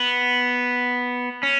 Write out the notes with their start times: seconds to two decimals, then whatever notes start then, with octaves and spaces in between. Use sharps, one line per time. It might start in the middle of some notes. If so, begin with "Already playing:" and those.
Already playing: B3
1.43 C#4